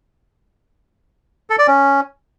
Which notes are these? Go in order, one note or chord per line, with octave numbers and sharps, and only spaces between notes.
A4
D5
C#4